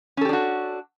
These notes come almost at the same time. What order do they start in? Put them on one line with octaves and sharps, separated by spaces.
C#4 A4 G4 D4 F#4